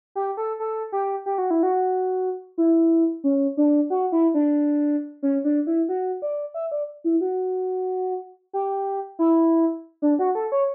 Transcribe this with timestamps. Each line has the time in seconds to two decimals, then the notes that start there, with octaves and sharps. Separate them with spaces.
0.15 G4
0.37 A4
0.60 A4
0.92 G4
1.26 G4
1.38 F#4
1.51 E4
1.63 F#4
2.58 E4
3.24 C#4
3.57 D4
3.90 F#4
4.12 E4
4.34 D4
5.23 C#4
5.44 D4
5.67 E4
5.89 F#4
6.22 D5
6.54 E5
6.72 D5
7.04 E4
7.21 F#4
8.53 G4
9.19 E4
10.02 D4
10.19 F#4
10.35 A4
10.52 C#5